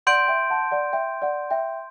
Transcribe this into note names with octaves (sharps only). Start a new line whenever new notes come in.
D5 F#5 C6 G6 D7
E5 G5
F#5 A5
D5 F#5
E5 G5
D5 F#5
E5 G5